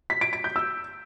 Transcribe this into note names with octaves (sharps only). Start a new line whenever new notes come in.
B6
D7
D7
G6
E6